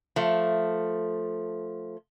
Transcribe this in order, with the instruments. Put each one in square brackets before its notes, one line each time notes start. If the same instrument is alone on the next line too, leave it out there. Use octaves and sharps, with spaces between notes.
[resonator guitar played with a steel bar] F3 A3